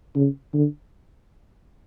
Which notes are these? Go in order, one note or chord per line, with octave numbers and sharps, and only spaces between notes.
C#3
D3